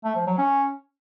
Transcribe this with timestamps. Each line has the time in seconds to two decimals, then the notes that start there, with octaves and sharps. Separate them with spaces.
0.04 A3
0.16 F3
0.27 F#3
0.38 C#4